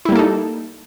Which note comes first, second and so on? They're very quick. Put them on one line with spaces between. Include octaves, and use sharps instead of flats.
E4 G3 A#3 A4 D#4